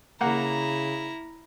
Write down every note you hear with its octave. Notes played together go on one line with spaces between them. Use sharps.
C#3 A#3 E4 F#5 A#5